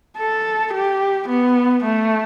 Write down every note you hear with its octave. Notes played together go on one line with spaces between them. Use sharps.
A4
G4
B3
A3